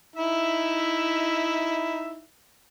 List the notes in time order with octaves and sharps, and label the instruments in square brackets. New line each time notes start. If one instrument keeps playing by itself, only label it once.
[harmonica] D#4 E4 E5